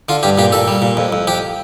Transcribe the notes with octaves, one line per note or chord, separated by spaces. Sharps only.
D3 F4
G2 G4
A#2 G4
A#2 A4
G3
A#2
F2
F2
F2 G4